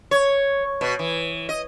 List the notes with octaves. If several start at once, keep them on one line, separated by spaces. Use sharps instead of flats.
C#5
B2
E3
D#5